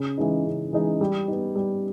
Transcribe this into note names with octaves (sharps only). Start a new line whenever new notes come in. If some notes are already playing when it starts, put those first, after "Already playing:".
Already playing: C#3
E3 G#3 D#4
C#3
E3 G#3 D#4
G3
B3 D#4
G3